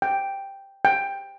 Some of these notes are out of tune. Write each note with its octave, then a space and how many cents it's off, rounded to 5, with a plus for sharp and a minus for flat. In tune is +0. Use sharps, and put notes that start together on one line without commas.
G5 +0
G5 +10